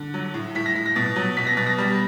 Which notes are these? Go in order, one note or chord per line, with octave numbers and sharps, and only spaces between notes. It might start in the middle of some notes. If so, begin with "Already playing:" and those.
Already playing: D3
F#3
A2
A2 B6
A#6
A2 B6
A#6
B2 A6
F#3
B2 B6
A#6
B2 A6
A#6
G3